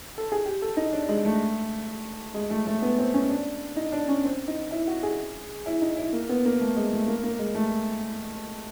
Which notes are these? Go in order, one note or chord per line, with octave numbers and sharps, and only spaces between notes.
A4
G#4
G4
A4
D#4
D4
G#3
A3
G#3
A3
A3
B3
C4
C#4
D4
D#4
D4
C#4
C4
D#4
E4
F#4
G#4
E4
D#4
E4
A#3
B3
A#3
A3
G#3
A3
A#3
A#3
G#3
A3